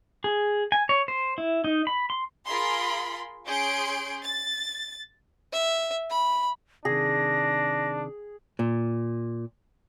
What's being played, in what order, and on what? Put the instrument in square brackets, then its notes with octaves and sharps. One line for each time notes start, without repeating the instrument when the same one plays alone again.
[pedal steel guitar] G#4
G#5
C#5
C5
E4
D#4
B5
C6
[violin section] F4 G#4 A#4 B5 C6
C#4 G#4 C6 G6 D7
A6
[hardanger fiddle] E5
B5
[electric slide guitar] C3 D#3 [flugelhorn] D4 [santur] G#4 [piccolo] A#6
[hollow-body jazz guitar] A#2